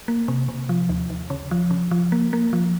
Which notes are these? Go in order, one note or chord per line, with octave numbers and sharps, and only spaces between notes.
A#3
C3
C3
F3
D#2
D#2
C#3
F3
C#3
F3
A#3
A#3
F3